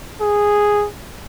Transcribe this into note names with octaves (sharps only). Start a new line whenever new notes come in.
G#4